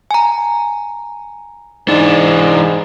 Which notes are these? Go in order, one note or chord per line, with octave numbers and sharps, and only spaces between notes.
G#5 A#5
G#2 E3 D4 D#4